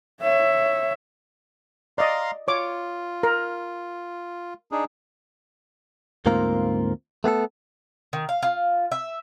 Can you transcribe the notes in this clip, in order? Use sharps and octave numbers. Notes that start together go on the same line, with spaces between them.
C#5 E5
D5 D#5 F5 A#5 C6
F4 C#5 D6
A#4
D4 D#4 G#4
D2 G#2 A#3 C4 F4 A#4
A3 B3 G#4 A4
D#3
F5
F4
E5